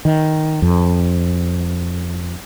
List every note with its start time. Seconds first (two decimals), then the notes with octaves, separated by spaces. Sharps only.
0.05 D#3
0.62 F2